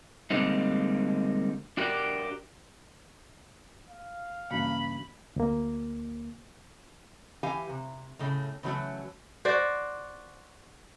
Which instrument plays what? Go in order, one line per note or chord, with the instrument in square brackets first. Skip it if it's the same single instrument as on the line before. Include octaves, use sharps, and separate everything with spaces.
[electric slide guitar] D3 G3 G#3 A#3 C4 D#4
D4 F#4 G4 A#4 D5
[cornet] F5
[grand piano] G2 C#3 [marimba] E3 A#3 F#4 [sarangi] B5
[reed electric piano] D2 A#3
[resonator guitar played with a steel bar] E3 G4 F5 G#5
C3
A2 C#3 A3
C#3 E3 F#3 A3 F#4
[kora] F#4 C5 D5